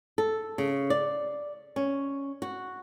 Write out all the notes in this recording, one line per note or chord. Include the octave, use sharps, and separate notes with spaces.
A4
C#3
D5
C#4
F#4